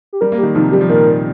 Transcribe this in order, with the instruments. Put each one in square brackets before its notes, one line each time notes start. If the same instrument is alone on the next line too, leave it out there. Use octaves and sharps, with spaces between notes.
[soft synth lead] G4
[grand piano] G3 [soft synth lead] A#4
[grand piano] A#3
[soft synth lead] G4
[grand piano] D#3 G3
[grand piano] C3 F3 [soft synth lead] D#4
[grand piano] G3 [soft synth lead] G4
[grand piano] F3
[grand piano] A#2 D#3 [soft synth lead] A#4